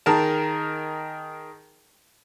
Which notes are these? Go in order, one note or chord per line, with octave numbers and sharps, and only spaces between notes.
D#3 G#4 A#4 A5